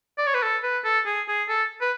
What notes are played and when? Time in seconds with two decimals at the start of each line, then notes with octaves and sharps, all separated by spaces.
0.18 D5
0.27 C#5
0.34 B4
0.43 A4
0.63 B4
0.84 A4
1.06 G#4
1.28 G#4
1.49 A4
1.81 B4